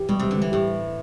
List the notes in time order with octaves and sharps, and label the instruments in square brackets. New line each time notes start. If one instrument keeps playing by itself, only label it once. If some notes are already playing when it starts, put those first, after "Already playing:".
Already playing: [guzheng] E3 [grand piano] G4
[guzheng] B2 [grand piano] G3
[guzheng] C3 [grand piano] G3
[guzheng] D3
[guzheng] E3 [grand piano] G3
[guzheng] A2 [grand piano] G4